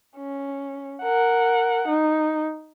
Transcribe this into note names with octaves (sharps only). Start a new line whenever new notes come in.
C#4
A#4 F#5
D#4